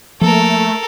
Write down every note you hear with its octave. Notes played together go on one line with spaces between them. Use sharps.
F3 A3 A#3 A4 A#4